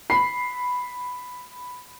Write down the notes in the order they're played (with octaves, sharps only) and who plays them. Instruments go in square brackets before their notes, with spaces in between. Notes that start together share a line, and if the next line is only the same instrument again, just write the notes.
[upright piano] B5 C7